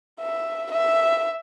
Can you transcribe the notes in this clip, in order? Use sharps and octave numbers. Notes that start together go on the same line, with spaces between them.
E5
E5